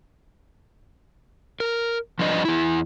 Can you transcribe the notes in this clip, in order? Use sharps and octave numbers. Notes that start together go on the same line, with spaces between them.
A#4
F3 G3 D4 B4 D#5
E2 E4